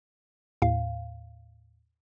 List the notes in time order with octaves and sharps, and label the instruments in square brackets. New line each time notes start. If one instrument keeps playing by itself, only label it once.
[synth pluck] D#2 A2 F5